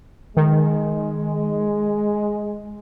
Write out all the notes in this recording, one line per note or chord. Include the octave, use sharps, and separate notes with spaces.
D#3 G#3